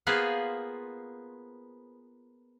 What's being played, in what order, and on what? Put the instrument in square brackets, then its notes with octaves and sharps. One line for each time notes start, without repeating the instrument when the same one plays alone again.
[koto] A#3 B3 F4 G#4 B4 C5